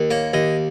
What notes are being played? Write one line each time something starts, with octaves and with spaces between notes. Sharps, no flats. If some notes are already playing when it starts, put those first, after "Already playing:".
Already playing: D#2
A#3 C#5
D#2 D#5